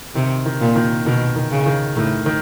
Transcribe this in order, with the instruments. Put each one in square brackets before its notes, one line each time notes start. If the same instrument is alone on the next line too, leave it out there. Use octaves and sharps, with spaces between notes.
[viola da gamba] C3 [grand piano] D#3
[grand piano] D#3
[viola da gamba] A#2
[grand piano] D#3
[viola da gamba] B2 [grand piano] D#3
[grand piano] D#3
[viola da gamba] C#3
[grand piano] D#3
[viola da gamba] A2 [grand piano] D#3
[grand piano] D#3